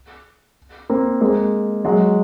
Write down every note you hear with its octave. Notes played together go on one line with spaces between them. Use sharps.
A#3 C4
G#3 A#3
F#3 G#3